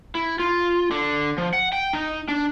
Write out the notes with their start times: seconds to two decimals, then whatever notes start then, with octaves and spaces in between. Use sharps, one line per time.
0.15 E4
0.39 F4
0.91 D3
1.38 F3
1.53 F#5
1.73 G5
1.93 D#4
2.28 D4